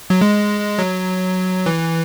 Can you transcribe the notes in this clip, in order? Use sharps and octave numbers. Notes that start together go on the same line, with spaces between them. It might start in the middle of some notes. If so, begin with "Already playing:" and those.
F#3
G#3
F#3
E3